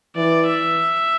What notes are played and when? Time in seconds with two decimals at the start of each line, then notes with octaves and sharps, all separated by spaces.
0.16 E3 D5
0.47 E5